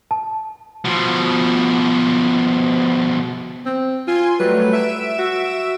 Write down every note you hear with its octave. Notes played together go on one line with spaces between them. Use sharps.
A5
B2 F3
C4
F4 G#5 C6
F#3 G3 A3 B4
E5 D7 E7
F#4